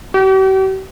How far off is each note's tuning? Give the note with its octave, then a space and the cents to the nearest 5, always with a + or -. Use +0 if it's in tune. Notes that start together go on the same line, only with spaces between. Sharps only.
G4 -45